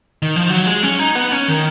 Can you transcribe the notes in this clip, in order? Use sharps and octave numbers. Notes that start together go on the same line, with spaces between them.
D#3
F3
F#3
G#3
C#4
D#4
B3
C#4
D#3